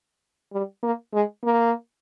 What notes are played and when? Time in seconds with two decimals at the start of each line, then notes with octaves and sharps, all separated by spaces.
0.53 G3
0.83 A#3
1.13 G#3
1.44 A#3